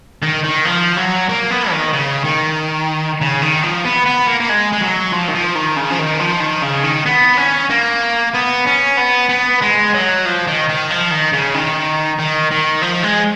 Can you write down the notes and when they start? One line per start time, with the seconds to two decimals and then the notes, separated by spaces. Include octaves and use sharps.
0.22 D#3
0.43 D#3
0.65 F3
0.96 F#3
1.29 A#3
1.51 B3
1.71 D#3
1.93 C#3
2.25 D#3
3.21 C#3
3.42 D#3
3.63 F3
3.85 B3
4.06 B3
4.27 A#3
4.40 A#3
4.49 G#3
4.73 G#3
4.82 F#3
5.13 F3
5.28 D#3
5.34 F3
5.55 D#3
5.77 C#3
5.91 F3
5.99 D#3
6.20 F3
6.41 D#3
6.63 C#3
6.84 D#3
7.06 B3
7.37 C#4
7.70 A#3
8.34 B3
8.66 C#4
8.97 B3
9.29 B3
9.62 G#3
9.94 F#3
10.25 F3
10.47 D#3
10.69 D#3
10.91 F3
11.11 D#3
11.33 C#3
11.54 D#3
12.19 D#3
12.51 D#3
12.82 F3
13.03 G#3